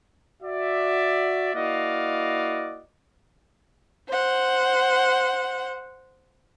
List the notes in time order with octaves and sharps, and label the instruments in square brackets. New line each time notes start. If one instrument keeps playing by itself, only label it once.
[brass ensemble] F#4 D5 E5
A#3 E4 F#4 D5 D#5 F5
[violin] C5 F#5